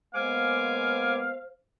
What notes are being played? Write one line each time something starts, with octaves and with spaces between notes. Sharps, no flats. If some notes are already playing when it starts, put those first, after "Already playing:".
G#3 A#3 B3 C5 F5 G#5 D6